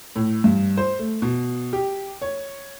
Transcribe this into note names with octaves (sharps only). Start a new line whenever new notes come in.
A2
G2
C5
A3
B2
G4
C#5